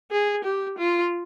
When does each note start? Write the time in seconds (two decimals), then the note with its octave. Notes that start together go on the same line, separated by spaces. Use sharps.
0.11 G#4
0.44 G4
0.78 F4